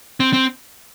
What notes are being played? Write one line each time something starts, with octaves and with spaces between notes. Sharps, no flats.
C4
C4